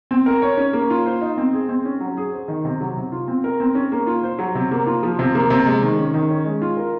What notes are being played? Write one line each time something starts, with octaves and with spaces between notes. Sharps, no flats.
C4
A#4
C#5
C#4
A#3
F4
C5
D#4
C4
G#4
C4
C#4
F#3
G#4
C5
D#3
C3
F#3
C3
F4
C4
A#4
C4
C#4
A#3
F4
C5
F#3
C3
A#3
F4
F3
C3
A#3
C3
G#3
D#3
C#4
D#3
C#4
G#3
F4
A#4